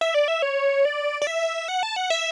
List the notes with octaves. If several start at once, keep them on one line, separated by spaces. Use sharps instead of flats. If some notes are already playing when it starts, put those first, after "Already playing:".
E5
D5
E5
C#5
D5
D5
E5
F#5
A5
F#5
E5